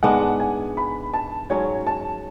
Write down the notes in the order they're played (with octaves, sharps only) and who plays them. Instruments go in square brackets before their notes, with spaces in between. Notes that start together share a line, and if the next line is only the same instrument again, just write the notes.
[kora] G#2 G#3 B3 D4 [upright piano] F#5
[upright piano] G#5
B5
A5
[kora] G#2 F#3 C#4 [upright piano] C#5
[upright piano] A5